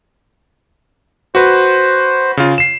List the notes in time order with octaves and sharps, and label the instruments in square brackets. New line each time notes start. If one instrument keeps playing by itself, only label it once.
[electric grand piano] F#4 B4 [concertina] C5
[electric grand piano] C#3 F4
C7 E7